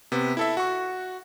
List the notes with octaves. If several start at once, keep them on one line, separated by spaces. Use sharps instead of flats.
C3 B3
E4 A4 E5
F#4 C#6